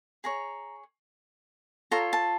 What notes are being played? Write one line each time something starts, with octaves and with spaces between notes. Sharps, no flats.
G#4 C#5 A#5
F4 A4 C#5 A#5
A5